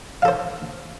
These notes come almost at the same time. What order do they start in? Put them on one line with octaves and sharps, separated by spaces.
F5 A4 C5